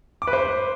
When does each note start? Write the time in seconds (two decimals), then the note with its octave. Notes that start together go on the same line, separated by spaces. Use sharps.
0.22 D6
0.27 B4
0.33 C5